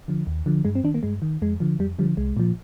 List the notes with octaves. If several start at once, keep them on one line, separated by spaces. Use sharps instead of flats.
D3 F3
D#2
D3 F3
G2 G#3
C4
D#3 D4
A#3
G2 G#3
D#3
F2 G#3
D3 F3
F2 G3
D3 F3 G3
C2 G#3
A#2 F3